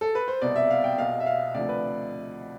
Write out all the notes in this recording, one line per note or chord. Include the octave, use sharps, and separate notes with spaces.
A4
B4
C5
C2 B2 D5
E5
F5
G5
B1 B2 F5
E5
F5
D2 C3 F3 D5
B4